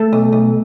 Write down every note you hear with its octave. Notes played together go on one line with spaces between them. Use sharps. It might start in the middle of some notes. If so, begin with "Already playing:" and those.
Already playing: A3 A4
B1
B1